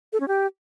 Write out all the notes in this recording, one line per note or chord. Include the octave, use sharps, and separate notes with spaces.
A4
C#4
G4